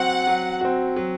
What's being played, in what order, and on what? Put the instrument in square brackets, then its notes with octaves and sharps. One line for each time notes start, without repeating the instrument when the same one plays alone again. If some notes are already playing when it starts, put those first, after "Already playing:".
Already playing: [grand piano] F#3 C4 F#4 [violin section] F#5
[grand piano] F#3
C4 F#4
F#3